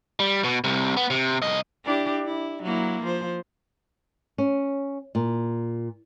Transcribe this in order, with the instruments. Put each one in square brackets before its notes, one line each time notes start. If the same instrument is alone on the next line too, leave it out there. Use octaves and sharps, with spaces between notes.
[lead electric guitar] G3
B2
C2 C3
B3
C3
C2 D#5
[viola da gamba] D4 E4 G4
E4
F#3 A#3 E4
F3 C5
[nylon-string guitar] C#4
A#2